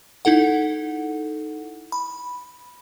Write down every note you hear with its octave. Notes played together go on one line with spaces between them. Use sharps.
D#4 E4 A4 F#5
B5